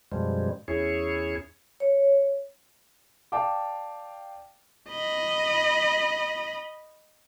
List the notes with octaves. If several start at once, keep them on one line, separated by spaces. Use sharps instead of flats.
F#2 B2 F3 G3 G#3
E2 C#4 E4 G#4 C#5
C#5
D5 F5 G5 A5 D6
D#5 B5